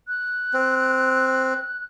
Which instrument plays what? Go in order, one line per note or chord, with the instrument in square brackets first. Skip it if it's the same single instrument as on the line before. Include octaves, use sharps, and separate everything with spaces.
[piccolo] F#6
[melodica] C4